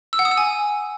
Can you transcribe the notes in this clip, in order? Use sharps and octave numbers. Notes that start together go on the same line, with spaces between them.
E6
F#5
D#6
E6
G#5